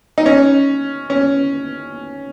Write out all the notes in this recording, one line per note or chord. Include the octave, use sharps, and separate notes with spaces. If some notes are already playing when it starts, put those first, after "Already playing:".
D#4
C#4
C#4